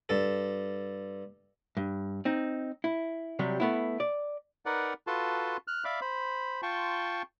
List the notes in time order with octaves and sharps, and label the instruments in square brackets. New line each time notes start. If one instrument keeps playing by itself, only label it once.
[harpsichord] G2 A4
[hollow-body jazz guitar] G2
C4 D#4
E4
C3 F#3 G3
A3 B3 E4
D5
[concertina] D#4 A#4 B4 D5 F#5
F4 F#4 A4 B4 A5 C6
F6 F#6
D5 E5 F5 B5 D6
C5 B5
F4 G5 A5 C6 C#6